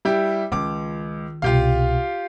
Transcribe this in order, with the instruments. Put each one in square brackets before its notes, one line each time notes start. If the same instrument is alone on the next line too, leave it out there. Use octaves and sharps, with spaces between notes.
[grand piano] G3 E4 G4
[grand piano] C#2 D6 [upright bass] D#3 F4
[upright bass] C2 B2 [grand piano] F4 G4 F5